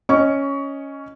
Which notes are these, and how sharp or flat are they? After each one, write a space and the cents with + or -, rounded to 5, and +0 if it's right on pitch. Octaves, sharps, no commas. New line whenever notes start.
C#4 +0 D#5 +0 C#6 +15